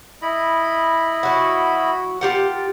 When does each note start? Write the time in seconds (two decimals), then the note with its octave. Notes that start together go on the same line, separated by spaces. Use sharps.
0.22 E4 D#5 B5
1.23 F#3 F#4
2.21 F4 G4 A#4 F#5